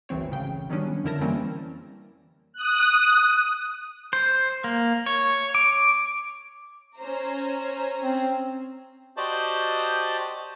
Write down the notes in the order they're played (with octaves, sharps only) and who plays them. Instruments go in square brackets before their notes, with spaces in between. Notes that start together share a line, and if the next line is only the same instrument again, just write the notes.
[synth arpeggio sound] G#1 D2 E3 C4 C#5
A1 C#3 G5
D#3 F#3 G3 B3 C#4 D4
F2 D3 E4 A#4 A5 A#6
E3 G3 A#3 C4 C#4 E4
[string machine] D#6 F#6
[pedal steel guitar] C5
A#3
C#5
D6
[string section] C#4 C5 A#5
[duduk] C4
[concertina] F#4 G4 C5 D5 D#5 A5